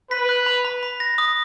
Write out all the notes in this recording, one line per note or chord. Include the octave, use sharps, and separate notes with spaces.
B4 B6
F#6
B5
B5
B5
A#6
D#6